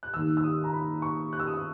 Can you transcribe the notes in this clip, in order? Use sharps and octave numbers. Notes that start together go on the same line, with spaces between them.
F#6
D#2 D#3 E6
E6
D#6
A#5
B5
C#6
F#6
E6
D#6
E6